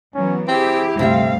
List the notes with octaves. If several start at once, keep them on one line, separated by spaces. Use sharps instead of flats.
E3 F#3 B3 C#4
C4 E4 G4 G#4
D2 G2 C3 C4 E5 F5